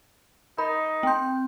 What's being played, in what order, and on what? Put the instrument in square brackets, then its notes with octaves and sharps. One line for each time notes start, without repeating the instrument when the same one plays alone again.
[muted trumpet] D#4 [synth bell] A#4 [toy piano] B5
[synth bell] C4 G6 [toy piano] G5 C6